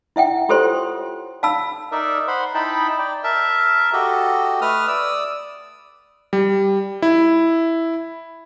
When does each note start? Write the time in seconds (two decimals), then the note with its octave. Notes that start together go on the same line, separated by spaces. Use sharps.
0.16 E4 E5 F#5 G5
0.49 F4 G4 A4 C5 C#5 C6
1.43 F5 A5 B5 E6
1.92 D#4 A#4 D5 E5
2.28 C5 F#5 B5 C6
2.55 D#4 E4 G5 A5 B5
2.99 D5 G5
3.24 A#4 E5 A5
3.93 F#4 G4 A4 D#5
4.61 A3 B4 D#6 F6
4.88 D5 D#6 E6
6.33 G3
7.02 E4